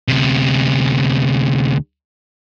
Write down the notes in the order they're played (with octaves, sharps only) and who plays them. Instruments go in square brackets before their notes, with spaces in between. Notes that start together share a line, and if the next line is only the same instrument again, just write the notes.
[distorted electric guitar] D2 C3